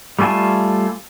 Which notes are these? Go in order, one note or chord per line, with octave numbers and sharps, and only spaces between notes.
G3 A3 F4 G#5 A5